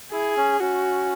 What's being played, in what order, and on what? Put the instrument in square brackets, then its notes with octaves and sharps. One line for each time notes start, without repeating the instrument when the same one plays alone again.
[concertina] E4 [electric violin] G#4
[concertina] C#4
[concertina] C#4 [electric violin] F#4